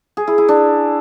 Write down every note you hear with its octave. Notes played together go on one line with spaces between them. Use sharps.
G#4
E4
E4
D4